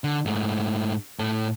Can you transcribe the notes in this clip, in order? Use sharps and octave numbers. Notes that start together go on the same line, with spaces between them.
D3
G#2 A3
A2 A4